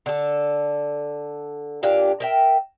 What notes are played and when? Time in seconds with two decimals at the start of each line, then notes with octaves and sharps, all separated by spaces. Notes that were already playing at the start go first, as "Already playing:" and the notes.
0.06 D3 A4
1.83 A#2 D4 G4 F5
2.20 A#4 E5 G5